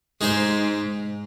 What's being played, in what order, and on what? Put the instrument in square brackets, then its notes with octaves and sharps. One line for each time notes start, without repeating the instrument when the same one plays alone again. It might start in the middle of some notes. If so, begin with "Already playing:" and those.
[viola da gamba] G#2 [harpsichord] G#3 D#4 G#4 C5